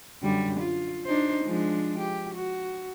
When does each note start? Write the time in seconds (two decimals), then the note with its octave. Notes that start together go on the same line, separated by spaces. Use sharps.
0.22 F#2 D3 G3
0.60 F4
1.05 D4 D#4 C5
1.44 F3 G#3 D4
1.99 G4
2.34 F#4